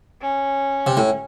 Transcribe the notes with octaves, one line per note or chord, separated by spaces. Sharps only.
C#4
C3
A2